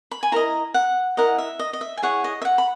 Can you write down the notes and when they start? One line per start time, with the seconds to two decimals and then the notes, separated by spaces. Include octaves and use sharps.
0.11 B5
0.23 G#5
0.32 E4 A#4 D#5 A#5
0.74 F#5
1.17 E4 A#4 D#5 F#5
1.38 E5
1.59 D#5
1.73 D#5
1.81 E5
1.97 G#5
2.02 E4 G#4 C#5 F#5
2.24 D#5
2.42 E5
2.45 F#5
2.58 B5